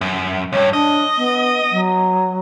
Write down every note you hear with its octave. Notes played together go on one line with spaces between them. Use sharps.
F#2
C#2 G2 C#5
D4 D#5
B3
F#3